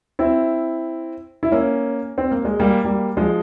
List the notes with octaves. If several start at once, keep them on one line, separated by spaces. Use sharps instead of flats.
C4 E4
E4
A#3 C#4
C4
A#3
G#3
G3 A#3
G3 A#3
F3 G#3